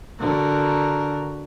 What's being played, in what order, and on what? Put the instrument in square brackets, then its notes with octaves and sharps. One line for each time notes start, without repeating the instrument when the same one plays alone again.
[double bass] D3 [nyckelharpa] F#4 A#4